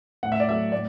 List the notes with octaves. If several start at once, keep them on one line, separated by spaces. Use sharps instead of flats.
A2 F#5
E5
D5
F#3 A3 E5
A2 D5